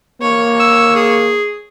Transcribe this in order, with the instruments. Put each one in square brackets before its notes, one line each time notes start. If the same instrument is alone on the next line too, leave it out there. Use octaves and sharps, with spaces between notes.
[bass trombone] A#3 [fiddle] C#5
[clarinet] E6
G#4